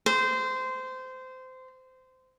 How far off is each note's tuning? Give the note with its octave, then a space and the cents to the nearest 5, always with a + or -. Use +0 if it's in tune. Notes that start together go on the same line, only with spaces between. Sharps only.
C5 -20